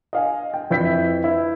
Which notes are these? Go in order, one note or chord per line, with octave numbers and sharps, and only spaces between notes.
D#5 F5 G#5
G5
F2 E4 B4 E5 G6 B6
E4